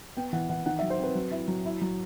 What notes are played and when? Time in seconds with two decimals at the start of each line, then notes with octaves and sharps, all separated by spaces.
0.17 B3 G5
0.33 E3 F#5
0.49 E3 F#5
0.66 D#3 F#5
0.79 E5
0.82 F#3
0.90 C5
0.98 C4
1.03 B4
1.15 F#3
1.31 E4
1.48 F#3
1.65 E4
1.81 F#3